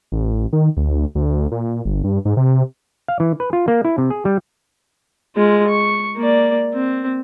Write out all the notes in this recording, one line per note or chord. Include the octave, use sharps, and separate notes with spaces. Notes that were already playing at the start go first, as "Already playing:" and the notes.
A1
D#3
D2
D2
A#2
G1
G2
G#2
C3
F5
E3
B4
F4
A#3
E4
C3
G#4
G3
G#3 F4
C#6
A#3 D5
C4